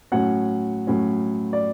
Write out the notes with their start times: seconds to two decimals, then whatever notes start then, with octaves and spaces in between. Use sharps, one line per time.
0.12 A2 F#3 C#4 F#5
0.87 A2 F#3 C#4
1.53 D5